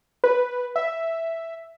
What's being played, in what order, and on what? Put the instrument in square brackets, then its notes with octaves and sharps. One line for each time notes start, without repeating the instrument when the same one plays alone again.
[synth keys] B4
E5